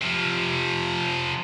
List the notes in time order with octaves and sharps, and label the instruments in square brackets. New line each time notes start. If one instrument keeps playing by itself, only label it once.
[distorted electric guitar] C3 F3